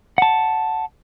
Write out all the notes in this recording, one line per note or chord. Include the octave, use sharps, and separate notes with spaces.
F#5 A5